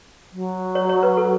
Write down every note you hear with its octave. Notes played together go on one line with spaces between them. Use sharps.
F#3
C#5
C#5
B4
A4